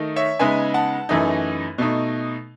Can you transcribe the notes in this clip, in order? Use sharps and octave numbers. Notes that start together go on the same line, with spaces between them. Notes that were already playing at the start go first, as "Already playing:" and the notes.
Already playing: D#3 A3 D#4
C#5 E5
C#3 G#3 B3 D#4 E5 G#5
F#5 A5
F#2 E3 A3 D#4
B2 A3 D#4